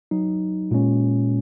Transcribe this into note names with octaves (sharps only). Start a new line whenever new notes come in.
F#3 D#4
A#2 G#3 C#4